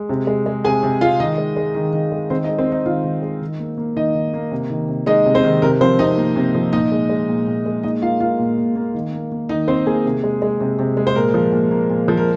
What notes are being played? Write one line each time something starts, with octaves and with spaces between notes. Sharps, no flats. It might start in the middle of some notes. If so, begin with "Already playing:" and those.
Already playing: G#3
C3
G#3
G#3
C3 G#4 G#5
C3
G#3 F4 F5
D#3 D#4 D#5
G#3
G#3
D#3
D#3
G#3
D#3 C4 C5
D#4 D#5
G#3
C4 C5
G#3 D#4 D#5
D#3 F4 F5
D#3
G#3
D#3
A#3
A#3
D#3 D#4 D#5
D#3
A#3
C3
D#3
C3
G#3 D#4 D#5
C3
C4 C5
D#3
C3 A#4
F3 C4 C5
C3 D#4 D#5
A#3
C3
F3
A#2 D#4 D#5
G#3
G#3
A#2
A#2
G#3
A#2 D#4 D#5
A#3 F4 F5
A#3 F4 F5
A#2
A#2
A#3
D#3
A#3
A#3
D#3 D#4 D#5
D#3 C4 C5
A#3 G#4
C3
G#3
G#3
C3
C3
G#3
C5
A#2 A#4
F3
A#2
A#3
A#2
F3
A#4